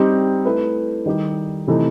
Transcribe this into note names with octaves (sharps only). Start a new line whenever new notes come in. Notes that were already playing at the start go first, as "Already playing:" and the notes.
Already playing: G3 C4 D#4 G4
A3 E4 B4
D#3 G3 D#4 G4
C3 E3 A3 D#4